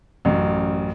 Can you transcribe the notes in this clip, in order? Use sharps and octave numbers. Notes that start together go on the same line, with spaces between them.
A1 F#2